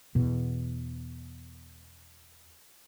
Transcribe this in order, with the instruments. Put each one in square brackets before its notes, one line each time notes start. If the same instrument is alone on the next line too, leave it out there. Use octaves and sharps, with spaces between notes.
[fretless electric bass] E2 B2